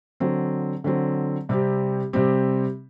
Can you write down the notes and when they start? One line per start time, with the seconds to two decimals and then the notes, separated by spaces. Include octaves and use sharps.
0.20 D3 F#3 C4
0.84 D3 F#3 C4
1.49 C3 G3 C4 G4
2.13 C3 G3 C4 G4